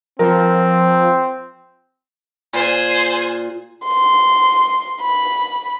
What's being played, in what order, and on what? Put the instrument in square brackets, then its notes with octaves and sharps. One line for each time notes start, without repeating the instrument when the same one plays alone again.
[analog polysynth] F3 [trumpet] C4 [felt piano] A#4
[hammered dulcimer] A#2 [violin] G#4 C5
[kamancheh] C6
B5